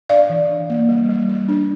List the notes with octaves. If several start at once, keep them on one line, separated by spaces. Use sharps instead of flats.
D4 D5 F5
E3
D4
A#3
G3
G3
G3
D4